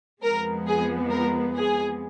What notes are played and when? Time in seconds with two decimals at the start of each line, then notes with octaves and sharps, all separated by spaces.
0.22 F2 F3 G#3 B3 A#4
0.67 G#4
1.11 A#4
1.55 G#4